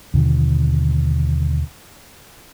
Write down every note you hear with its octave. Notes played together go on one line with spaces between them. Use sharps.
D#2 B2 D3 F3